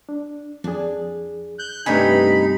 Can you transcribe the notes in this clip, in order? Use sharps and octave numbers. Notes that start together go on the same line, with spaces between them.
D4
F2 D4 G#4
F#6 G6
G2 C3 A3 B3 D4 D#4 G#5 B5